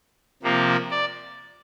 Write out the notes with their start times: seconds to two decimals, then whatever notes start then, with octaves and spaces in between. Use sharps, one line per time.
0.43 C3 F3 A#3
0.91 D5